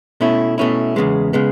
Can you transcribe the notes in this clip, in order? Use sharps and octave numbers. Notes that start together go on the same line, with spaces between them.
B2 A3 C#4 E4
B2 A3 C#4 E4
E2 C#3 G#3 B3
C#3 G#3 B3